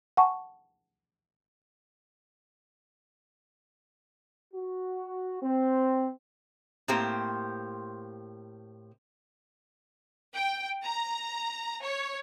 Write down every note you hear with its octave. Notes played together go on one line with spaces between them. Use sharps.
F#5 G#5 A5 C#6
F#4
C4
A2 A#3 C4 G4 C5
G5
A#5
C#5